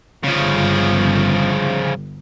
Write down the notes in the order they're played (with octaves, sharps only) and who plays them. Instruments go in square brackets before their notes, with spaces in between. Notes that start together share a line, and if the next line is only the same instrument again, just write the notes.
[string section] G1 [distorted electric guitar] C#3 F3